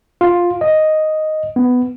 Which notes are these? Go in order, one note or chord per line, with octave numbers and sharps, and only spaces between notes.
F4
D#5
B3